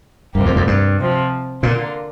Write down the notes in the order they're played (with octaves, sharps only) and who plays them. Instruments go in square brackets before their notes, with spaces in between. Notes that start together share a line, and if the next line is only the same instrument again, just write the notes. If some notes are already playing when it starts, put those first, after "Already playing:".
[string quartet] D2 C3 G3 A#3 G4 [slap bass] G2
[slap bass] F2
F2
G2
[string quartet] C3 F3 C4
[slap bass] A#2 [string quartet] D3 A#3 F4